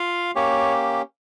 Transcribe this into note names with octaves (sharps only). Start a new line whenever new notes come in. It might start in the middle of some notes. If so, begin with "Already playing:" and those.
Already playing: F4 F5
A#3 C#4 G4 C#5